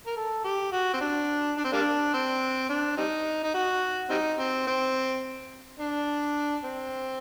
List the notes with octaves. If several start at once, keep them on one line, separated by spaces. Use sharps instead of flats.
A#4
A4
G4
F#4
C4
D4
D4
C4
G3 A#3 D4
C4
D4
G3 C4 D#4
D#4
F#4
G3 C4 D#4
C4
C4
D4
C4